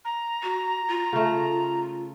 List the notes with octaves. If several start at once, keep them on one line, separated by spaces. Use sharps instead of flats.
A#5
F#4
F4
C#3 A3